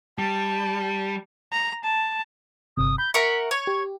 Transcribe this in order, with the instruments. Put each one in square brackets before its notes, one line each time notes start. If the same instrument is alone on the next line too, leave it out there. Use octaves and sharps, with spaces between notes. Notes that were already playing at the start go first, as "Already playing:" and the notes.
[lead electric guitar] G3 [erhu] A5
[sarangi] A#5
A5
[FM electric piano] G1 C3 [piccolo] D#6
[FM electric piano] B5 [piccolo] G6
[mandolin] A#4 F#5 C#6 [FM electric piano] E5 [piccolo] B6
[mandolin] C#5 [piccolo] C#6
[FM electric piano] G4